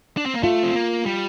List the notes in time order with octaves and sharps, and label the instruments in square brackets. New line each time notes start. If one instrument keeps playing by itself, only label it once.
[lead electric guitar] D4
C4
A#3
[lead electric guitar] A3 [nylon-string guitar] F4
[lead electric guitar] C4
A#3
G3